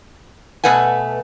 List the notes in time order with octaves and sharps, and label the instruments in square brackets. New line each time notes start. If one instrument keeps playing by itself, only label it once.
[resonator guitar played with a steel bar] B2 A3 B4 F#5 G#5